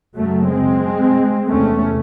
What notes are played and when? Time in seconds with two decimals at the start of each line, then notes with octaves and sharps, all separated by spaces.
0.16 F#2 C#3 F#3 A3
0.50 G#3 C4
1.50 E2 C3 A3 C#4